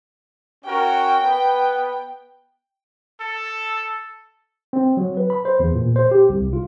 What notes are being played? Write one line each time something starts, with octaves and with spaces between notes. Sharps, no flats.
C#4 F#4 A#4 G5
B3 B4
A4
C4
F#3
B4
B5
C5
E2
A#2
C5
G4
C2
F4